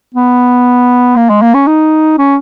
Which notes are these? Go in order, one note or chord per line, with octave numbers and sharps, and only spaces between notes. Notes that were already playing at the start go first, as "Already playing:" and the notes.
B3
A#3
G#3
A#3
C#4
D#4
C#4